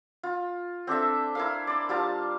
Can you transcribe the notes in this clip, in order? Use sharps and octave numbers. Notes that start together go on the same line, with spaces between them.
F4
C4 D4 A4 E5
E4 A#4 F5
D5 C6
G3 F4 A5 A#5